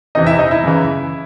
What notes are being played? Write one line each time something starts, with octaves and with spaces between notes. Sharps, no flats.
E2 C3 E3 D#4 D#5
E4 E5
D#4 D#5
E4 E5
F#2 C#3 E3